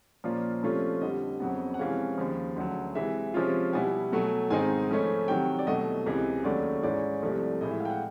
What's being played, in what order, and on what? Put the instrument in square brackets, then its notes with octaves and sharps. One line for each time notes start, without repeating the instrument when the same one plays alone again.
[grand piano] A#2 F3 A#3 C#4 F4 D5
C3 F3 A3 C#4 F4
F2 D3 G3 D#5
F2 C#3 F#3 B3
F#5
F2 C3 E3 G#3 C#4 F5
D#2 C#3 F3
D2 C#3 F#3
C3 E3 G#3 E5
C3 F3 G#3 C#4 F4
B2 G3 B3 E4 G#5
B2 F#3 A3
G#2 D#3 G#3 C4 D#4 G#5
C#3 F3 A3 C#4
C3 D#3 F#3 G5
D5
C2 B2 F#3 A3 D#5
C#2 C3 E3 G#3
D#2 C#3 F#3 A3 C#4 D5
G#2 E3 G#3 C#4 D5
C2 C3 F3 A3
A2 E3 G#3 D#5
E5
F5
G5
F#5